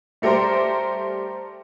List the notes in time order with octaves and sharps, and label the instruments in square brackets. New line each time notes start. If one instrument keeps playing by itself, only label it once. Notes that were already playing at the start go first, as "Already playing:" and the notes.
[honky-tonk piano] G3 A3 G4 A#4 C5